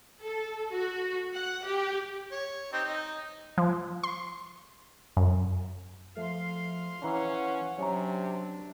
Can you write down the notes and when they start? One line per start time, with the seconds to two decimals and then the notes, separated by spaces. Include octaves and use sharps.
0.22 A4
0.72 F#4
1.34 F#5
1.65 G4
2.32 C#5
2.73 C4 D#4 G4
2.85 D#4
3.58 F3
4.03 C6
5.17 F#2
6.17 F3 A3 F5 C6
7.03 E3 C#4 F#5 A#5
7.78 C3 F#3 C#4 D4 C#5 A#5